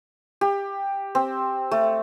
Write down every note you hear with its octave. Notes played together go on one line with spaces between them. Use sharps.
G4
C4
A3